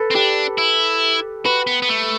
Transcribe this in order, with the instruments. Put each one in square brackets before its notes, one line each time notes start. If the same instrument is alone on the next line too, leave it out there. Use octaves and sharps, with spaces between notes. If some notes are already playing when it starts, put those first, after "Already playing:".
Already playing: [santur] A4 B4
[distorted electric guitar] C4
[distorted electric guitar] D4 [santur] G4
[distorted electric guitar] E4
[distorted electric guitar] F#4 [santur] B4
[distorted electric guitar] B3
B3
A3